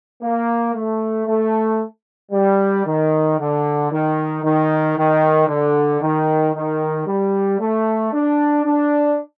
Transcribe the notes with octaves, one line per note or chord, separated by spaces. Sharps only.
A#3
A3
A3
G3
D#3
D3
D#3
D#3
D#3
D3
D#3
D#3
G3
A3
D4
D4